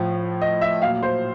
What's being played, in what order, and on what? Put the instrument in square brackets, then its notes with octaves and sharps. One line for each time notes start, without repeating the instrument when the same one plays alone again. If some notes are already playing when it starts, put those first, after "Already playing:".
Already playing: [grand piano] A2 F3
D#5
E5
A#2 F#3 F5
C5